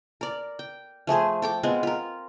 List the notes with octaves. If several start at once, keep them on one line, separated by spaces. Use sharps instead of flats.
A#4 D5
G5
F3 A3 G#4 C5
A4 G5 D6
G#3 B3 C4 F4
F4 A#4